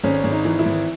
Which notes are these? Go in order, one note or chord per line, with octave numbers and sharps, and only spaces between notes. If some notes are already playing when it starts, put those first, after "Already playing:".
G#1 C#4
G#1
D#4
E3
E4
G#1